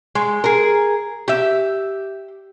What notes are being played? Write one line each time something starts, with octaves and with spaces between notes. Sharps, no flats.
G#3
G#4 A#4
G4 E5